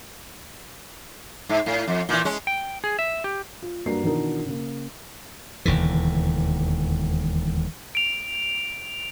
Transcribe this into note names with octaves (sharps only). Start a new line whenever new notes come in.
G#2
A2
F2
A#2 E3
G#3 C#4
G5
G#4
E5
G4
F4
G2 A#3 F#4 D5 A#5 C7
B2 D#3 E3 D4 D#4 A#4
C#3 A#3
E1 D#2 D3 E3
D7 F7